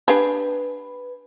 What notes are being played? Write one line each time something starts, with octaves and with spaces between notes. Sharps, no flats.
D4 G4 G#4 B4